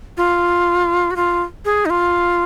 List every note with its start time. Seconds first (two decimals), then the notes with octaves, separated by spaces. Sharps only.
0.17 F4
1.11 F#4
1.16 F4
1.65 G#4
1.86 D#4
1.90 F4